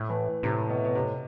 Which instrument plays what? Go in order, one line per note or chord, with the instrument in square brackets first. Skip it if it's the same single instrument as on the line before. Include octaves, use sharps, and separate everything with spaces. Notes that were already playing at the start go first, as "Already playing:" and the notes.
Already playing: [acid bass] A2 [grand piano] A3
[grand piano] E3
[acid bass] A2 [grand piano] C3
[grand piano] B2
B2
C3